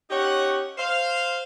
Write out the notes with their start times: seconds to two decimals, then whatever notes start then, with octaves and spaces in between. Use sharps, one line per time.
0.10 C#4 D#4 G4 C#5 F#5
0.78 C5 F5